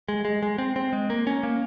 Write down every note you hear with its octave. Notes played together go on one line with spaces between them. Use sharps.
G#3
G#3
G#3
C4
C4
G#3
A#3
C#4
A#3